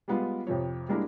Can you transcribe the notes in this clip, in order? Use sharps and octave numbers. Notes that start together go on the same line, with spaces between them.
G3 G#3 B3 F4
F2 C3 F3 C#5
G3 G#3 A#3 D4 E4 A#4